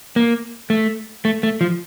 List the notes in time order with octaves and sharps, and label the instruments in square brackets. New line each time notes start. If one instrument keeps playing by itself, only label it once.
[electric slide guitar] A#3
A3
A3
A3
F3